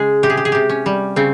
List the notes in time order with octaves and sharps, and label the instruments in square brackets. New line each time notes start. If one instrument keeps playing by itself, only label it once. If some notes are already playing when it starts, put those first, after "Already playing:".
Already playing: [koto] C#3 G#3 G#4
C3 G4
G#4
G4
G#4
C3 G4
C#4
G3
C#3 C4